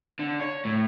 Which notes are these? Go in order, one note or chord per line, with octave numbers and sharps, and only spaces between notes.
D3
C#5
A2